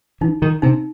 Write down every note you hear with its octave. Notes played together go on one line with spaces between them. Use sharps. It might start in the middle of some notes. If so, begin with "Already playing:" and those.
E3 D#4
D#3
C3 D#4